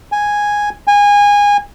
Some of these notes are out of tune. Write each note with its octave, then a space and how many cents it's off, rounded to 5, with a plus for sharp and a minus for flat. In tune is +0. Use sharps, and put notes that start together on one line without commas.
G#5 -5
G#5 -25